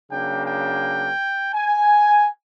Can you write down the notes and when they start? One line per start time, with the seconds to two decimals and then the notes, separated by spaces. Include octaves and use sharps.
0.10 C#3 F#3 A#3 D4 G5
0.46 G5
1.53 G#5